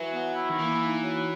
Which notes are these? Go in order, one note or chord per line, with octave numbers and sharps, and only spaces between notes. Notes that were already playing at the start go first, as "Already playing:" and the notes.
Already playing: E3 F#3
B3
E4
D#3
E3 A#3
D#4
F#3